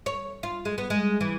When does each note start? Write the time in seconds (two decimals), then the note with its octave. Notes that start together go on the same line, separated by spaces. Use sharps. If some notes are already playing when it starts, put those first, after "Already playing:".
0.06 C#5
0.43 F4
0.65 G#3
0.78 B3
0.90 G#3
1.21 E3